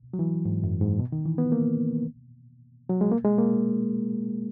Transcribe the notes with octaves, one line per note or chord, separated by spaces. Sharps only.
F#3
E3
G#2
F#2
G#2
B2
D#3
E3
B3
A#3
F#3
G#3
A#3
G#3
A#3